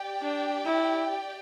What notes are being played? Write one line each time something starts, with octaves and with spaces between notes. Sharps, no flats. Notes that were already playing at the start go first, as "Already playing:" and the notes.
Already playing: G4 D5 G5
D4
E4